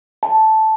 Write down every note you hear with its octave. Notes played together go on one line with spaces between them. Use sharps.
A5